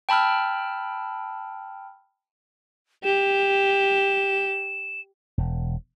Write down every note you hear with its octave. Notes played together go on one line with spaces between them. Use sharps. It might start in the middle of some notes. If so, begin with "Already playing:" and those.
G5 A5 B5 E6 F6
G4 E7
E1